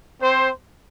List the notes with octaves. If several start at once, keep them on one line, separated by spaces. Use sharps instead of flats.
C4 C5